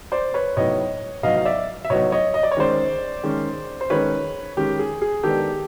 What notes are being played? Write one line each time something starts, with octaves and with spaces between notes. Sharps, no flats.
C5 D5
B4 C#5
A2 F#3 B3 D#4 C#5 D#5
A2 F#3 B3 D#4 D#5 F5
F5
D5 E5
E5
A2 F#3 B3 D#4 C#5 D#5
C#5 D#5
D#5
D5
C#5
D#3 G#3 C#4 C5 D5
D#3 G#3 C#4
C5
D#3 G#3 C#4 B4 C#5
D#3 G#3 C#4 G4
G#4
G#4
D#3 G#3 B3 D4 G4 A4